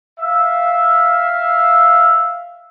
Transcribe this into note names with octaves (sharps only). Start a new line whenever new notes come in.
E5 F5